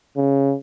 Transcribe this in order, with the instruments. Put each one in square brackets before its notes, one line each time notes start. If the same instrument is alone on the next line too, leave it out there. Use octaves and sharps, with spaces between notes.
[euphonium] C#3